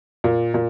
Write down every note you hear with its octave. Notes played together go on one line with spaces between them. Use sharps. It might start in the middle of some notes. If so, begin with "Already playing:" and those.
A#2
A#2